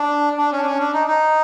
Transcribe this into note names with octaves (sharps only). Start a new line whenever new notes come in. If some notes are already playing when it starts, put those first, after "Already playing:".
Already playing: D4
D4
C#4
D4
C#4
D4
D#4
D#4